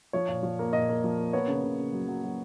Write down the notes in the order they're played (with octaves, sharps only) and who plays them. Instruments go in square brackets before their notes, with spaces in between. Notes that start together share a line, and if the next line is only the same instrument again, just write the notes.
[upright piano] F3 C#5
A#2
F3
A#3
A#2 D#5
A#3
F3
A#3
B3 C#5
C#3
C#3
C#3
F#3
F#3
F#3